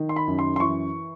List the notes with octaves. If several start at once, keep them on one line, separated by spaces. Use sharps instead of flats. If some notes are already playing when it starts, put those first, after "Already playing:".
Already playing: D#3
C6
B5
F#2
C6
C6
E3 C#6